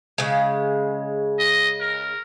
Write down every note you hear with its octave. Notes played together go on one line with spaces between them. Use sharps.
C#3 G#3
D#5
A#4